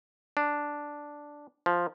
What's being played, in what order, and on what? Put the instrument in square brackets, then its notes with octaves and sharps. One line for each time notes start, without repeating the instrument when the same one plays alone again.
[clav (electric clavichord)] D4
F3